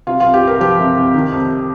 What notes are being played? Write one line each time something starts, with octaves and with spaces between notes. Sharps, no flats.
C3 F4
C2 F4
G4
C2
A#4
F3 G4
C3
C2
D#3
F2